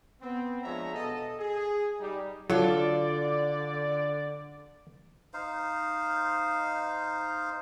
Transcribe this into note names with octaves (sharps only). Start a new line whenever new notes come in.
B3 C4
F3 G#3 D4 C#5 E5 A#5
B2 A4 D#5
G#4
G3 D#4
D3 F#3 F4 A4 D5
D#4 C5 F5